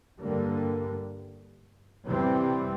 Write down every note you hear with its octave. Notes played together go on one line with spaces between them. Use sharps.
G2 D3 G3 A#3
C3 E3 G3 C4